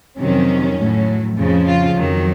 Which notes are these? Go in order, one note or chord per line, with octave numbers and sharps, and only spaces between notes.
F2 C3 D#3 F#3 C#4
A2 F#3
F2 C#3 F3
F4
F2 D#3 F#3